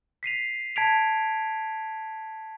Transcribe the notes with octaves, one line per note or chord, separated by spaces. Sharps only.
B6 C7 D#7 F7
A5 G#6 B6 D7 F7